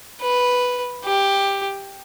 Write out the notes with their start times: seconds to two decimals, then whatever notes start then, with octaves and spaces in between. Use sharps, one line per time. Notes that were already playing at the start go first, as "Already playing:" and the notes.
0.22 B4
1.05 G4